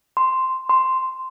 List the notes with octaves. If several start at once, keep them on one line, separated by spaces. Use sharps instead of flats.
C6
C6